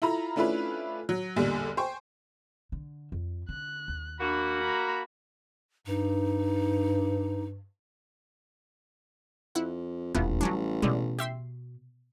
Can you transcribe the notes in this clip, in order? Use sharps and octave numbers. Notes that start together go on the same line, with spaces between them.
E4 F4 A4 A#5 B5
A3 C#4 D4 E4 F4 B4
F#3
B1 E2 A#2 D3 G3
C5 G5 G#5 C#6
D3
F2
D3 F#6
D#2
A#3 D4 F#4 B5
A#5 B5
G2 D#4
F2 E4 F#5
E1 A1 D#2 E3 F3 B3
F#3 G3 C#4 D4
B2 D3 G3 G#3
G4 E5 C6